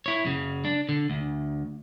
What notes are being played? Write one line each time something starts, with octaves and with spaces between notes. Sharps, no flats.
E4 C#5
F#2 C#3
D4
D3
D2